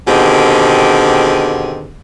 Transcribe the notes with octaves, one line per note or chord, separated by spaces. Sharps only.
B2 D3 D#3 C4 G4 G#4